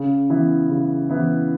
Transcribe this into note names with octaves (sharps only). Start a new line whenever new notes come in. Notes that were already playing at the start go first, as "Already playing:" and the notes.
Already playing: C#3
E3 B3 E4
C#3
E3 B3 E4